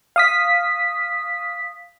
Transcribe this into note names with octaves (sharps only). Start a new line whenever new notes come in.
F5 D#6 B6